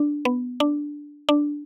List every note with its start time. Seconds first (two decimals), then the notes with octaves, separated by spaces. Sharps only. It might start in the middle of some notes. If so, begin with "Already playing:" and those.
Already playing: D4
0.25 B3
0.60 D4
1.29 D4